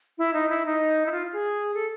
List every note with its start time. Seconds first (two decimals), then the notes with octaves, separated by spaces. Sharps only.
0.18 E4
0.34 D#4
0.49 E4
0.66 D#4
1.06 E4
1.12 F4
1.33 G#4
1.74 A4